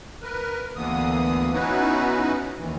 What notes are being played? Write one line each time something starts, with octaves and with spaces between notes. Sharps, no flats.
A#4 B4
D2 D3 E3 A#3 B3 D#6
B3 C#4 D#4 E4 F#4 B4
D#2 D#3 E3